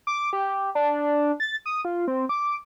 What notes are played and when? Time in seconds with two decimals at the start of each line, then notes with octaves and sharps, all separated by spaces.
0.07 D6
0.33 G4
0.75 D4
1.40 A6
1.66 D#6
1.85 F4
2.08 C4
2.29 D6